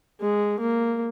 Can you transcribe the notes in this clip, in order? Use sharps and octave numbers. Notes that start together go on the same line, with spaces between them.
G#3
A#3